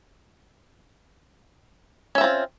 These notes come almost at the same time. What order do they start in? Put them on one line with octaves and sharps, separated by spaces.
C#4 E5 C4 F4